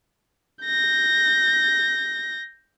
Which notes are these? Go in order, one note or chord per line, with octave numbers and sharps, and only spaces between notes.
G6 A#6